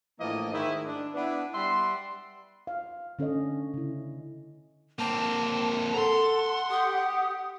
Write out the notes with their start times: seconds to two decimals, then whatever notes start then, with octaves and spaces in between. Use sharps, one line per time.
0.20 A2 E3 F3 A#3 D4 D#5
0.52 G#2 D#3 E4
0.85 D4
1.14 B3 D4 E4
1.54 G3 E5 F#5 C6
2.67 F5
3.19 D3 C#4 A4 C#5 D#5
3.74 C#3 E4
4.99 A#3 C4 A5
5.94 A4 F#5 A#5 C6
6.70 G4 D#6